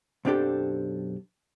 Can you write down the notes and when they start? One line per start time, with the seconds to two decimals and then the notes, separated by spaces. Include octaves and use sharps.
0.25 B1 F#2 C4 D4 G4 A4